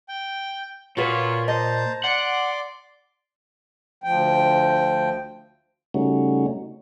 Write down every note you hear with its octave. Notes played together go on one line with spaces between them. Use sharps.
G5
A#2 F4 F#4 B4 C#5
C5 D#5 A5 A#5
D5 F#5 C6 D6
D2 F3 G5
C#3 G3 A3 C#4 D#4 F#4